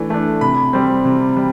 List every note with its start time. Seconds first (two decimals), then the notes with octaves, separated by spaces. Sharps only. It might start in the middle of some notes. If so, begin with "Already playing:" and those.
Already playing: E3 A3 D4
0.10 A3 D4
0.41 C3 B5
0.73 G3 C4
1.05 C3
1.37 G3